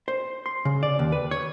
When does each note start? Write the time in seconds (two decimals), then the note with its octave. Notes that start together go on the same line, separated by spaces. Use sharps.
0.08 C5
0.46 C6
0.65 C#3
0.83 D5
0.99 D#2
1.12 B4
1.31 C#5